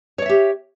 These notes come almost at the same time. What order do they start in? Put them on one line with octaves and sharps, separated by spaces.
C#5 D5 E5 G4